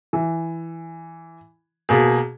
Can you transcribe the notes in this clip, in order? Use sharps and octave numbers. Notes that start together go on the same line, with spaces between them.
E3
B2 A#3 G#4